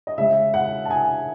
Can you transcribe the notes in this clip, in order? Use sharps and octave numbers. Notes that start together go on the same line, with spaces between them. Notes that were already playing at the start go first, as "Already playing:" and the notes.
D#5
C#3 G#3 E5
F#5
A5
G#5